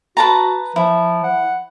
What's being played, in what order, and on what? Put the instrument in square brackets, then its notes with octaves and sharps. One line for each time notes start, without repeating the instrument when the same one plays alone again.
[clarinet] F#4 [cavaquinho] B4 A5 A#5
[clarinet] F3 [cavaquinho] E4
[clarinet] F#5